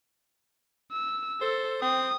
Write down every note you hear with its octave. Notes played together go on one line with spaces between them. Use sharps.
E6
A4 C5
C4 D#6